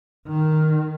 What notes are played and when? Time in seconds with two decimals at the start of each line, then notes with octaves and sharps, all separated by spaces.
0.27 D#3